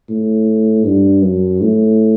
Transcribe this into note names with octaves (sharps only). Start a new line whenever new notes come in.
A2
G2
F#2
A2